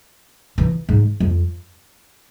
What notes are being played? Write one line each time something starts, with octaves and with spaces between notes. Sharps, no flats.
E3
G#2
F2